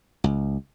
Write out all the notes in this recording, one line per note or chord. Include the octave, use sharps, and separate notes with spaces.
C#2